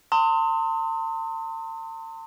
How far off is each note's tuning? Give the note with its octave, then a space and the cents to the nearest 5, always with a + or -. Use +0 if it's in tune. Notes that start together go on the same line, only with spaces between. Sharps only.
A5 +45 C6 +5 D#6 +35